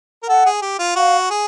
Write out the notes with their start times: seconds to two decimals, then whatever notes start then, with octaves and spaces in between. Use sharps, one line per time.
0.23 A#4
0.28 A4 F#5
0.46 G#4
0.62 G4
0.79 F4
0.95 F#4 F5
1.30 G#4